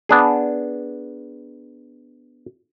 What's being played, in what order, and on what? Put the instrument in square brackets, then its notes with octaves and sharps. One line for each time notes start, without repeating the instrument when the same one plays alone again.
[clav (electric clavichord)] B3 D4 G#4